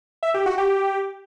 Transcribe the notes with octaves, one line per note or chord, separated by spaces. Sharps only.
E5
G4
F#4
G4